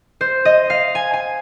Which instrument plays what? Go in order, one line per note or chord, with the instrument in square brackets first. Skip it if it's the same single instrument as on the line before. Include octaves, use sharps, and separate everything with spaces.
[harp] C5
D#5
F5
G#5
G#5